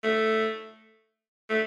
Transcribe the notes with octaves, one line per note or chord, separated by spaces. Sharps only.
A3
A3